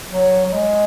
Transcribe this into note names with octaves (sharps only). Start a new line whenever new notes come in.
F#3
F#3
G#3